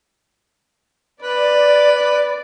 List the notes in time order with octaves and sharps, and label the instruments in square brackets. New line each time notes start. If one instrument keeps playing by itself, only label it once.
[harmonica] B4 [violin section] D5